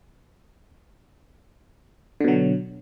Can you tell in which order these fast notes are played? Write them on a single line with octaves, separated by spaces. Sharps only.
D3 B2 F#3